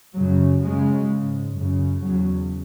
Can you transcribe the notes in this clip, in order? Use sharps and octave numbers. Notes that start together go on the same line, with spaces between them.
F#2 C#3 F#3
F#2 C#3 G#3
G#2
F#2 C#3
E2 C#3 F#3